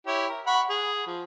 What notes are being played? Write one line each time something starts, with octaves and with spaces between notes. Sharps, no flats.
E4 G4 C#5
A#4
F#5 B5 C#6
G#4
F3